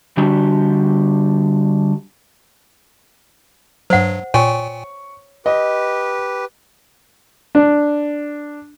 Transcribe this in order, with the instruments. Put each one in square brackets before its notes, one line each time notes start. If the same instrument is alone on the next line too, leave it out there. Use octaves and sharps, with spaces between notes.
[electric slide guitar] D3 G3 D4 F#4 G4
[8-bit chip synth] G2 F#3 [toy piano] C5 F#5
[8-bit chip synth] A#2 G5 G#5 [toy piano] C#5 [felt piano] C#6
[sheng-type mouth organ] G4 B4 [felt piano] D#5
[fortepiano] D4